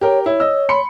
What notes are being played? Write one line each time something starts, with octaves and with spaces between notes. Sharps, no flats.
G4 A#4 C#5 G5
E4 C#5
D#5 E6
B5 C6 C#7